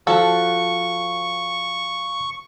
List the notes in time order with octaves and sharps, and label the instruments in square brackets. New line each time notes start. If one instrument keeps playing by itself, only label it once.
[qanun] F3 F#4 [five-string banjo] A4 [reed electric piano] F5 A5 [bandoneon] C#6